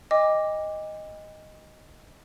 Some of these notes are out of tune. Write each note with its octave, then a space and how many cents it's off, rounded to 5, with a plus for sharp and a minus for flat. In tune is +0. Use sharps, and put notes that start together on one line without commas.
D#5 +0 G5 +45 D6 +0